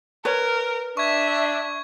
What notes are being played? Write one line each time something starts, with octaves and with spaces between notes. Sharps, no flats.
A#4 B4 C#5
D4 E5 C#6 G#6